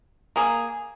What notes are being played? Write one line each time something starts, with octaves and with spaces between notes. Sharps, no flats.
A#3 G#4